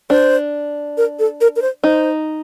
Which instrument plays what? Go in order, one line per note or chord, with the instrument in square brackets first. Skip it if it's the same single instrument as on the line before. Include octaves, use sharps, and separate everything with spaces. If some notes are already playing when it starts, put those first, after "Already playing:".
[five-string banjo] D4 [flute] C5
[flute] A#4
A4
A#4
A#4
C5
[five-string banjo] D#4 [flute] C5